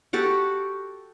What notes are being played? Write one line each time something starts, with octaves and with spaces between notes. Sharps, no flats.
F#4 G4 A4